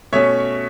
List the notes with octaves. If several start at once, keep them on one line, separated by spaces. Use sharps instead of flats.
B2 A3 C#4 C#5 E5